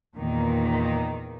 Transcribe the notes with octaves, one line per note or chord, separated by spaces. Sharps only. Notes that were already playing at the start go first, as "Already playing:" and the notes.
E2 A#2 D#3